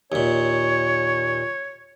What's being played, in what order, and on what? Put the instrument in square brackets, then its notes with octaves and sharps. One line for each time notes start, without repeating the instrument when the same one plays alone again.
[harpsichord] D#2 A#2 [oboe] C#5